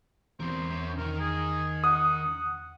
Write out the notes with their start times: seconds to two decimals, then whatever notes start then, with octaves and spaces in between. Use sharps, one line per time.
0.40 E2 C4 A#4 C5
0.70 C#4 A#4
0.97 D#3 D#4 A#4
1.20 G#4
1.84 F#5 D#6